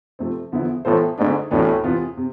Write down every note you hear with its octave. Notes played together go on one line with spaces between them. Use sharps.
C3 F3 A3 C4
E2 D3 F3 B3 E4
A2 E3 B3 F4 A4 C5
G#2 D3 A3 D4
D2 A2 C3 E3 B3 D4
E2 C3 E3 B3 F4
C3